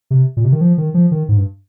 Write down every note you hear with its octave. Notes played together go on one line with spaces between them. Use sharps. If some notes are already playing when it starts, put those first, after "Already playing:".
C3
A#2
C3
D#3
F3
D#3
F3
D#3
G#2
G2